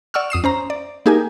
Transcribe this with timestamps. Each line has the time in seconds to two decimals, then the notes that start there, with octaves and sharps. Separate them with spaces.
0.14 D5 F#5 C#6 E6 F6
0.30 F2 D#6 C7 E7
0.44 C#4 C5 A#5
0.70 D5
1.06 A#3 D#4 G4 G#4 A#4 G#5